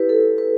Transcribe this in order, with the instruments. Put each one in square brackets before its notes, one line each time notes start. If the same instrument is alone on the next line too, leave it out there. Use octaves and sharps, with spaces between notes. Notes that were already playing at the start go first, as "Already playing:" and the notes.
Already playing: [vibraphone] E4 G4 B4
A4
B4